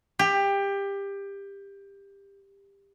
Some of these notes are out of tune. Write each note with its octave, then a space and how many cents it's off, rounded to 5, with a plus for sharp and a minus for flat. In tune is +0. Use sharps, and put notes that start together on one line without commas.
G4 +20